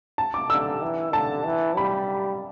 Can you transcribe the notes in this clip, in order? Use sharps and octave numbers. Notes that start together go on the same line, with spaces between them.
A5
D6
D3 E6
E3
D3 A5
E3
G3 B5